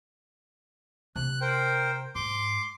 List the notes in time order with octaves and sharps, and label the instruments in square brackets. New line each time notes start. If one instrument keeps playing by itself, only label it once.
[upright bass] C3 [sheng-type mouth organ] F#6
[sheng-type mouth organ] A#4 C5 G5
[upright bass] G#2 [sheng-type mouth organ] C6 D6